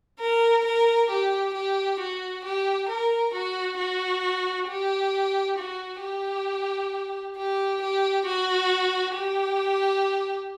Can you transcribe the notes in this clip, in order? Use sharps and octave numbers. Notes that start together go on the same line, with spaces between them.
A#4
A#4
G4
G4
F#4
G4
A#4
F#4
F#4
G4
F#4
G4
G4
G4
F#4
G4